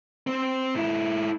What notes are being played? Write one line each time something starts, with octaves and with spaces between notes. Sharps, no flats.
C4 C5
G#2 E4